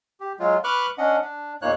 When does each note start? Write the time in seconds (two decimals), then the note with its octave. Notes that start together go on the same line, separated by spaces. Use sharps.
0.20 G4
0.39 F#3 G#3 F4
0.64 B4 B5 C#6 D6 F6 F#6
0.98 C#4 D4 D#5 F#5
1.22 D4
1.62 E2 A#2 A#3 D#4 C#5 F#6